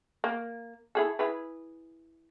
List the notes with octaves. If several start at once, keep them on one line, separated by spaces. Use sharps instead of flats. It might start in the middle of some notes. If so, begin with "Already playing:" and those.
A#3
E4 G#4 A4
E4 G#4 B4